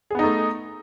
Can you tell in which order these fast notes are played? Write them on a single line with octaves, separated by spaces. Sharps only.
G#4 B3 D#4 A3